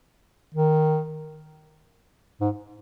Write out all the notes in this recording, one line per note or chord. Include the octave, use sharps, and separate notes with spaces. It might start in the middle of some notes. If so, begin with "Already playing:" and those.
D#3
G#2